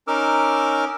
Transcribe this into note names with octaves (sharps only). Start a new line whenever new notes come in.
C#4 D#4 A#4 D6 E6 F6